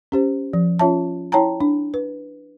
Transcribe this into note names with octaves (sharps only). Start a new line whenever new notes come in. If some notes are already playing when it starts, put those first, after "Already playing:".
C#4 G4 C5
F3
C#4 F4 C#5 E5 A5
E4 C#5 G5 A5 A#5
D4
B4